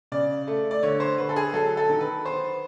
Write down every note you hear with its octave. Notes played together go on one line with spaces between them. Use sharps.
C#3 D5
A3
D5
D3 C#5
C5
D3 B4
A4
G#4
F#3 A4
A4
D#3
B4
B3 C5